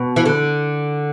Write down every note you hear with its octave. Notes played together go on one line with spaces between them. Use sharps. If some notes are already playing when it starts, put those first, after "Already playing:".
Already playing: B2
E3
D3